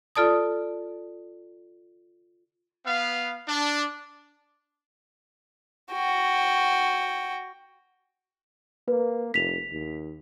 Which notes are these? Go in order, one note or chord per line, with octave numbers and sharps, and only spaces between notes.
F4 A4 D5 A5 D#6
B3 F5
D4
F#4 G5
A#3 B4
F1 B6 F7
D#2